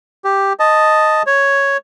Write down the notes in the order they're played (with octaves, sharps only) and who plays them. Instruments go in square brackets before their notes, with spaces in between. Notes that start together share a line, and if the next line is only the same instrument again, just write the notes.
[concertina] G4
D#5 A5
C#5